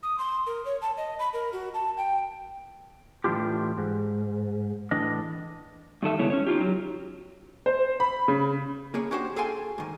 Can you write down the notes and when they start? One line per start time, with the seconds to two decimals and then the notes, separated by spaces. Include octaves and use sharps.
0.03 D#6
0.18 C6
0.47 A#4
0.65 C#5
0.82 A5
0.97 D#5
1.19 B5
1.33 A#4
1.53 F#4
1.74 A5
1.97 G5
3.24 A2 E3 F3 D4 F4 G4
3.78 G#2
4.91 A2 E3 D4 D#5
6.03 G2 D#3 A4 E5
6.18 E2 C#3 G#3 B3 E4 C#5
6.30 C#4 C#5
6.47 D#4 F4 G4
6.61 F#3
7.66 C5
8.00 B5
8.28 C#3
8.94 A#3 G#4 C#5
9.11 C#4 D4 F#4 G4 B4 C5
9.36 G#4 A4 F5 G5 G#5 C6
9.78 G#2 D#3